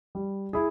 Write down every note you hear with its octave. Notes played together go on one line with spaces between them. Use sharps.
G3
E4 G#4